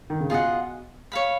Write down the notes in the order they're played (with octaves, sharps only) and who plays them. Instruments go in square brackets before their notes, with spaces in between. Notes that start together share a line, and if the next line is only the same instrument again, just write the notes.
[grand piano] D#3
C#3
[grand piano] B2 [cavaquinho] F4 G#4 D#5 F#5
[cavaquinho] C#5 F5 B5